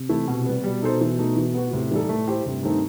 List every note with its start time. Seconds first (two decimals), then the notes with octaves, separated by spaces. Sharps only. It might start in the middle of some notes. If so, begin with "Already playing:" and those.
Already playing: C3
0.09 E3 A3 E4
0.28 B2
0.45 G3 B3
0.64 B2 G3
0.82 D#4 A4 C5
1.01 E3
1.19 A3 D#4
1.37 E3
1.54 B3 F#4
1.73 A2 C3
1.91 E3 G3 D#4 A4
2.09 A2 A3
2.28 E4 G4 C5
2.46 G2 C3
2.63 D#3 A3 C4 D#4